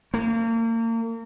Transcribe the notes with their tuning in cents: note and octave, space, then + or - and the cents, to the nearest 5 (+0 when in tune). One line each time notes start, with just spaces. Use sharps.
A#3 -35